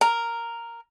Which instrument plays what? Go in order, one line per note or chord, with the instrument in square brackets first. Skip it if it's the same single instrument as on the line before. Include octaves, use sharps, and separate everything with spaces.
[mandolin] A#4 [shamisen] A#5